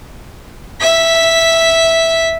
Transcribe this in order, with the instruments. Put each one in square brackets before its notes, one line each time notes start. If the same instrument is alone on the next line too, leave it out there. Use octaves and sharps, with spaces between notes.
[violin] E5 B6